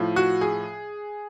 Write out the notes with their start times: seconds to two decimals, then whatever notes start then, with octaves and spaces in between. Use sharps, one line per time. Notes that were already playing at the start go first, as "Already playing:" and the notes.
Already playing: A2 F3
0.16 F#4
0.41 G#4